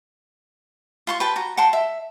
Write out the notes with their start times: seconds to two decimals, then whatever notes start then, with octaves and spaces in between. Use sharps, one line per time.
1.07 F4 C6 C#6
1.20 B4 G5 A5
1.36 F#4 A#5
1.57 F#5 G5 A5 C6
1.73 E5